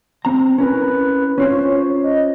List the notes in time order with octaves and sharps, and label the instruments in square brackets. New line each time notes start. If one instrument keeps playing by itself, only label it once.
[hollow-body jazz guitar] C4 A#5
[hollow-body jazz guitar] C#4 E4 A#4 [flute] B4
[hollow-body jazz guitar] C#4 F4 C5 [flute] C#5
[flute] D#5